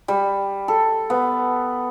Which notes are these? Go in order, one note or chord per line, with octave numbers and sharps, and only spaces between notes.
G3
A4
B3